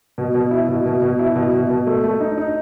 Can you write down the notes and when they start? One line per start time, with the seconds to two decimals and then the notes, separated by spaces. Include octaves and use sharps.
0.18 B2
0.34 B2
0.51 E4
0.69 B2
0.86 B2
1.02 B2
1.19 E4
1.36 B2
1.53 B2
1.69 B2
1.87 A3
2.04 A3
2.21 D#4
2.37 D#4